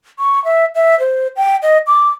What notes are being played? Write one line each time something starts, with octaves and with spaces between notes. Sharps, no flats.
C#6
E5
E5
C5
G5
D#5
D6